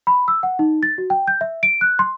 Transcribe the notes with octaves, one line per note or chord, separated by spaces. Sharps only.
B5
E6
F#5
D#4
A6
F#4
G5
G6
E5
D7
F#6
C6